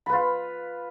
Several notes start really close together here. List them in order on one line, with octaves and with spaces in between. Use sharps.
B5 B4 F4